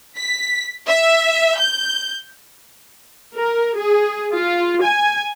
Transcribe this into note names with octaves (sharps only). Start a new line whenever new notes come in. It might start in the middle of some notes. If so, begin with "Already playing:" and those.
B6
E5
G6
A#4
G#4
F4
G#5